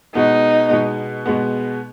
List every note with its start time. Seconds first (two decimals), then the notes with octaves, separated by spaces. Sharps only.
0.15 B2 G#3 B3 D#4
0.70 B2 G#3 B3
1.26 B2 G#3 B3